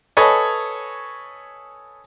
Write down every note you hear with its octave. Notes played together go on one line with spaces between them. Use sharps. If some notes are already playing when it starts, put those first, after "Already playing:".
A4 B4 C#5 D#5 G#5